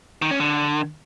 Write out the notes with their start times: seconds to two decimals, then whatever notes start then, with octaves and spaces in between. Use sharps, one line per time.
0.22 D#3
0.31 C#4
0.40 D3